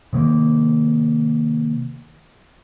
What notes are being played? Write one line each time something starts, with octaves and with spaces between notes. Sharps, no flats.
C3 D#3 A#3